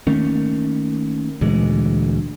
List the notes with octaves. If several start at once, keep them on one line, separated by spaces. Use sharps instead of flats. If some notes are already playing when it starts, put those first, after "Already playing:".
D#3 A3 A#3 C#4
D2 A#2 E3 G#3